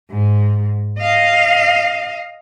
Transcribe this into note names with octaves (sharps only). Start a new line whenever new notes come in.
G#2
D#5 F5